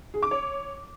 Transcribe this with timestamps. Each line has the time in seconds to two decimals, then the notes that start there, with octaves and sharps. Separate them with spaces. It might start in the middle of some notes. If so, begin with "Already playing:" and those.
0.14 G#4
0.23 D6
0.31 C#5